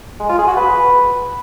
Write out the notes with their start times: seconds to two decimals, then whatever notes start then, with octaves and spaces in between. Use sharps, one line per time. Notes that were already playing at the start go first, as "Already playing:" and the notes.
0.20 G#3
0.29 F4
0.38 G#4
0.47 F#4
0.57 B4